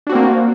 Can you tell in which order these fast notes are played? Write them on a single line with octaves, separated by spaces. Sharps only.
D4 F#4 C4 A#3